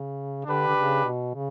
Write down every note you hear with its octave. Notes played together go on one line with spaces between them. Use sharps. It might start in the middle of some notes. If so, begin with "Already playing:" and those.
Already playing: C#3
D3 D4 G4 B4
D3
C#3
B2
C#3